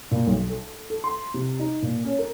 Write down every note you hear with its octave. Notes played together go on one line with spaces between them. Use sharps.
A#2
B1
A4
A4
C6
C3
D#4
A#2
C#4
A#4